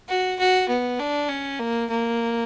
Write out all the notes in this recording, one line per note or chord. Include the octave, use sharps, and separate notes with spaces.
F#4
F#4
B3
D4
C#4
A#3
A#3